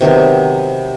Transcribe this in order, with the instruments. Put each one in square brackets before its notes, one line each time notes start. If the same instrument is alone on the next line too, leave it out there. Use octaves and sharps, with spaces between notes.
[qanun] C3 D#3 F#3 B3